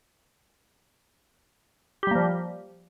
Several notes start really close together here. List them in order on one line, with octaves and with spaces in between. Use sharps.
G4 G3 A#3 F3